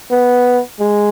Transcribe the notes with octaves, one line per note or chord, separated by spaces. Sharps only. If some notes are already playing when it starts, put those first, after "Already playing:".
B3
G#3